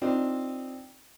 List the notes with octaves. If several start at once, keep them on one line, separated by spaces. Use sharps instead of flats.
C4 D4 D#4 F4